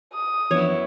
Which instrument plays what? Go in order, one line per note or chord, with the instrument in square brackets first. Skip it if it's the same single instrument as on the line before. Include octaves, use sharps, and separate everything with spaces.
[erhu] D#6
[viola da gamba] F#2 B3 E4 [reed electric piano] E3 F3 D4 [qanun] C#5